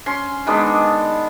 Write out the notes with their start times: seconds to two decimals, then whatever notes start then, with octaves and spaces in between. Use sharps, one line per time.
0.06 C#4 C6
0.47 D#3 G#3 B3 D4